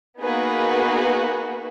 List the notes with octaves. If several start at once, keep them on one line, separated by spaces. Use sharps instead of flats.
A#3 B3 D#4 F#4 G#4 B4